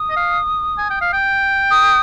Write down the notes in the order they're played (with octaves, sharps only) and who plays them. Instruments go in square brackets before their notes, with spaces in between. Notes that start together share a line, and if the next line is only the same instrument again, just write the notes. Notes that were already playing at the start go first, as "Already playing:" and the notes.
Already playing: [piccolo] D#6
[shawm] D#5
F5
G#5
G5
F5
G5
[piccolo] D#6